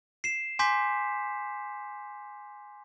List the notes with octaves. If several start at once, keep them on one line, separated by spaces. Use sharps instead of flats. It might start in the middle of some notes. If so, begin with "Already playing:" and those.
C7 E7
G#5 C6 D6 G6 B6